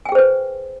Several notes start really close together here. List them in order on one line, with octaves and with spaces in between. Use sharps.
G#5 G5 G#4 C5 B4